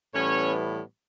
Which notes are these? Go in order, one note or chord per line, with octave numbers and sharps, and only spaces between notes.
A2 E3 G3 B3 C#4 C#5